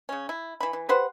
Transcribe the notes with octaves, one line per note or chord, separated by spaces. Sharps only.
C#3 C#4
E4
E3 B5
E3
G4 B4 C5 F#5